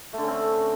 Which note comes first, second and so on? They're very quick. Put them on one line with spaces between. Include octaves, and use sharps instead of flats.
A3 D3 C#4 C4